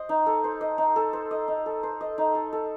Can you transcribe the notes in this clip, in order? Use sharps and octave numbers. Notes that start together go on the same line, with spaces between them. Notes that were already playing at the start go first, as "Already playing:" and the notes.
Already playing: C5 D#5
D#4
A4
C5
D#5
D#4
A4
C5
D#5
D#4
A4
C5
D#5
D#4
A4
A4